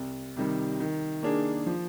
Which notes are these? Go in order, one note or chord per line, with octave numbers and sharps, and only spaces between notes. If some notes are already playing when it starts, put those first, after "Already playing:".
Already playing: C2
C3 D#3 G3
D#3
A#3 D4 G#4
F3